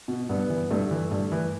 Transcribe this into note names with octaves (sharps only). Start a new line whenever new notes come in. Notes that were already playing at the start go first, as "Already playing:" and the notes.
B2
G2 B3
E3
G2 A3
E3
G2
E3